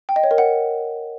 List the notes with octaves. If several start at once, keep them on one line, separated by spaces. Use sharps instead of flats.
G5
D#5
C#5
A#4
F#5